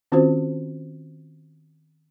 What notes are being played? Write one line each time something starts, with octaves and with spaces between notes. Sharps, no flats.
D#3 C4 C#4 F4 F#4 C5